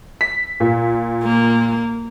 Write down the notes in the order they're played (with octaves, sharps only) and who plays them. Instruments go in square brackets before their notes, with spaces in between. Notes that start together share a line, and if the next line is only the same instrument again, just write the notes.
[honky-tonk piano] B6
A#2
[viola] A#3